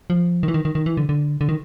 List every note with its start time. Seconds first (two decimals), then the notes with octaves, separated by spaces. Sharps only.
0.10 F3
0.43 D#3
0.48 E3
0.54 D#3
0.65 D#3
0.75 D#3
0.86 E3
0.97 D3
1.09 D3
1.41 D3
1.49 D#3